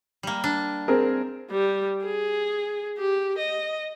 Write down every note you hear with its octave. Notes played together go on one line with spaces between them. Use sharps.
G3 A#3
D4
C4 G#4 A#4
G3
G#4
G4
D#5